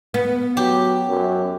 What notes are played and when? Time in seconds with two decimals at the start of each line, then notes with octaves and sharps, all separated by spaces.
0.14 B3
0.57 F#3 G4
1.07 F#2